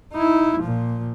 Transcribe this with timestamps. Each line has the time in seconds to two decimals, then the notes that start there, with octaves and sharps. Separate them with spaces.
0.13 D#4 E4
0.60 A#2 F3